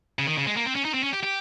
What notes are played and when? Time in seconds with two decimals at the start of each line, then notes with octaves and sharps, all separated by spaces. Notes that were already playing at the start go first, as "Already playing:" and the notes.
0.19 C#3
0.27 D#3
0.38 C#3
0.47 G#3
0.57 A#3
0.66 C4
0.75 C#4
0.85 D#4
0.94 C4
1.03 C#4
1.13 G4
1.23 G4